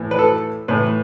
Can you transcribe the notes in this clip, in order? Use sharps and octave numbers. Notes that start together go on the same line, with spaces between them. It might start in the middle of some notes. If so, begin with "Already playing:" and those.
Already playing: A2 E3
B4
A4
A2 E3 B4